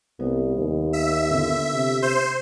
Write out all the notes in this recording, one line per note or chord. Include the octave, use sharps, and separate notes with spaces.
C2 B3
D#2
E5
D3 B3 F4
C3
C5